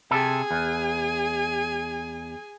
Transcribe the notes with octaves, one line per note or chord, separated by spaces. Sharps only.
C3 G#4 A4 G#5
E2